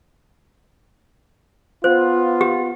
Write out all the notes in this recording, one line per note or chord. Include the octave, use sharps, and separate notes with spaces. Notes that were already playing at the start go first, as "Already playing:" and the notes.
B3 F4 C5
G4